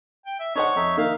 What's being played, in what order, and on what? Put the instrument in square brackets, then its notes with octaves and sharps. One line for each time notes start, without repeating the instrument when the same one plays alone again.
[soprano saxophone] G5
E5
[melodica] D4 [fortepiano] D#4 C5 F#5 [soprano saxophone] C#5
[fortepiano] F2 [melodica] D#4 E5
[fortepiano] D#3 A#3 [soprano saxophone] F5